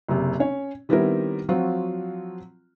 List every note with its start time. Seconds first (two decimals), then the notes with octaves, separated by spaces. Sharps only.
0.08 F#1 C3
0.40 C#4 C#5
0.89 D#3 G3 B3 C4 E4 A#4
1.49 F3 F#3 C4 F4 F#4